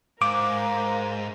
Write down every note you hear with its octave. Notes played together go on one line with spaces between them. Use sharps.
G#2 A#4 F5 D6